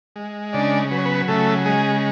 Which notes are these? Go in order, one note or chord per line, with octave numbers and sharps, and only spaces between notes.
G#3
C#3 D4 D5
F#3 B4
C#5
B3 B4
C#3 A3 A4
G#3 G#4